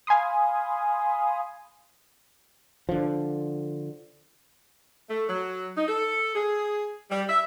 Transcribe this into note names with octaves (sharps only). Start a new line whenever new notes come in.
F5 G#5 B5 C6 D#6
D3 F3
A3
F#3
D#4
A4
G#4
G3
E5